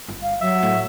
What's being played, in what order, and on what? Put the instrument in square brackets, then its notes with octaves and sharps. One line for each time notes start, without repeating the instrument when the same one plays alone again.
[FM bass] G1
[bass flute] F5
[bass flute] F#3 [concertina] E5
[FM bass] A2